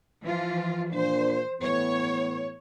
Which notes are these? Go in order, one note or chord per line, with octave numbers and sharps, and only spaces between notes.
E3 F3 F4
A#2 D4 C5
A2 E3 B3 C#5